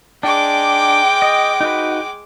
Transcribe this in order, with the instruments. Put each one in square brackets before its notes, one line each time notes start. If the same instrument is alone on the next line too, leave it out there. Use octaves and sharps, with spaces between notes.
[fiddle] G#3 D6 [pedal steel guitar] D4 [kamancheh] G5
[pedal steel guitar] D#5
D#4 F#4 B4